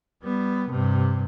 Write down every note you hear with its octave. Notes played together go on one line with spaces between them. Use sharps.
G3 B3
G2 C3